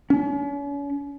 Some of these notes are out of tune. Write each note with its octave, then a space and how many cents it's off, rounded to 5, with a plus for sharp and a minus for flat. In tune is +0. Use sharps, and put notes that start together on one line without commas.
C#4 +40